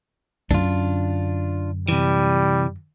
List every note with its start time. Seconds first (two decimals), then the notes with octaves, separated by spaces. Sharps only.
0.51 F#2 D3 D4 F4
1.88 C3 E3 G3